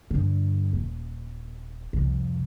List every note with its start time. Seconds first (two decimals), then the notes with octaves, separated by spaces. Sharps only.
0.11 G2 D3
0.73 D#1
1.93 C2 F2